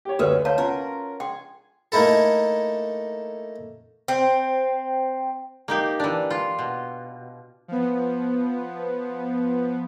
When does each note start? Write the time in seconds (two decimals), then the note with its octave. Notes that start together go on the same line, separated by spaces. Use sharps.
0.05 G4 C#5
0.19 D2 C#4 F#4 A4 B4 E5 F6
0.45 C5 C#5 F5 A5
0.58 C#4 F4 A#4 F#5
1.20 G#4 G5 C6
1.92 A3 A#3 D#4 E4 A4
4.08 C4
5.68 A#3 D#4 G4
6.00 E3 D4
6.30 F4
6.59 B2
7.68 F3 B3